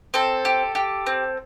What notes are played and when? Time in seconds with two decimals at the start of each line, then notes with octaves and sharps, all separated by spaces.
0.14 C4 A4
0.45 G4
0.75 G4
1.06 C4